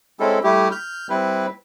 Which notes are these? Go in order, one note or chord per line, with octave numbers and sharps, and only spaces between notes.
G#3 C4 C#4 E4 A4
G3 A3 E4 G4
F6 G6
G3 C4 E4 B4